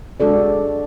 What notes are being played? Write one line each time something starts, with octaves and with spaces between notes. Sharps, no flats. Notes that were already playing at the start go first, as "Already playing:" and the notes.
G#3 D4 F#4 A4 D5